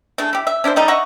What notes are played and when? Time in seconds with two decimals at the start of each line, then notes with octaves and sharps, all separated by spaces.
0.18 A3 D4 E4 G#4
0.33 E4 G4
0.47 E5
0.64 C#4 D4 E4 C5
0.76 F3 G3 D#4 A4
0.88 D#5 E5 F#5 C#6